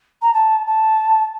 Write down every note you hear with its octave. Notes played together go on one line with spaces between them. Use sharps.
A#5
A5
A5